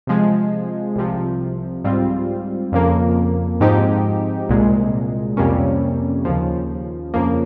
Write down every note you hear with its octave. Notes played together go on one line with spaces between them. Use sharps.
C3 F3 G#3
C2 C3 F3
G#2 G3 C4 F4
F2 C#3 F3 A#3
G#2 F3 C4 D#4 G4
C2 A#2 G#3
F2 C3 G3 A#3 C#4
D#2 C#3 F3
F2 C#3 F3 A#3